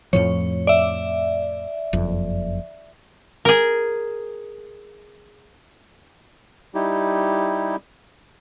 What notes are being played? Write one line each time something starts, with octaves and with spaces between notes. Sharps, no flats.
F2 A2 F3 C#5
D5 E5
F#1 F2
G#4 A#4
G3 D#4 E4 G4